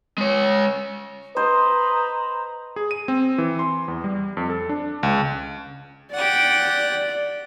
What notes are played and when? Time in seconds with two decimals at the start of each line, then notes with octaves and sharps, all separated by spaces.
0.18 G#3 C#5
1.36 B4 C5 D#5 A#5
2.76 G#4
2.91 D#7
3.08 C4
3.38 E3
3.59 C6
3.88 E2
4.04 G3
4.37 F2
4.50 A4
4.69 D4
5.03 C#2
6.14 G4 D5 F#5